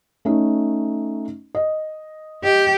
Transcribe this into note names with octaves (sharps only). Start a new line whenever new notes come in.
A3 C#4 D#4
D#5
G4 D#5